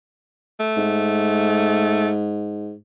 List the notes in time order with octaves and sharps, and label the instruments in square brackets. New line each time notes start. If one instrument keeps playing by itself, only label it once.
[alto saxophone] A3
[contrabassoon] G#2